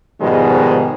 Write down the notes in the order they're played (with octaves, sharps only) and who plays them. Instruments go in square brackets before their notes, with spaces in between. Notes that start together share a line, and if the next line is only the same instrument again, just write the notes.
[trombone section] G#2 B2 D#3 F3 G3 G#3